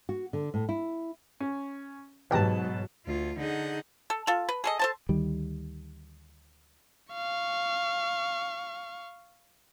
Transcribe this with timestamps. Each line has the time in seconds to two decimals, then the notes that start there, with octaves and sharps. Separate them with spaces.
0.09 F#4
0.33 D3
0.54 A2
0.69 E4
1.40 C#4
2.31 E2 G#2 B2 F#3 G4 B4 A5 A#5
3.06 D2 F4
3.38 D3 D#4 G#4 F#5 G6
4.10 A4
4.27 F4 A4
4.49 B4
4.64 G#4 A4 D#5
4.79 A4 C5 A5
5.09 D2 D#3 G3
7.13 F5 C#6